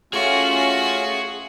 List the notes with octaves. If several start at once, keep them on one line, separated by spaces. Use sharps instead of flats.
A3 C#4 F4 F#4 G#4